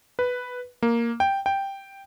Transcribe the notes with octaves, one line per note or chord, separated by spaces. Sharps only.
B4
A#3
G5
G5